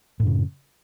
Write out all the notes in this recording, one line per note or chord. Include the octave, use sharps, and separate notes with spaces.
F#2 A2 C#3